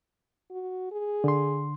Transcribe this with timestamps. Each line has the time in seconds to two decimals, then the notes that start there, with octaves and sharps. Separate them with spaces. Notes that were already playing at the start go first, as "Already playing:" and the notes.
0.50 F#4
0.91 G#4
1.24 D3 C6